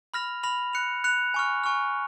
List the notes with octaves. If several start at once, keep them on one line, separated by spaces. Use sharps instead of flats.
B5 F6 A#6 F7
B5 F6 A#6 F7
F#6 C#7 F7
F#6 C#7 F7
G#5 C#6 F6
G#5 C#6 F6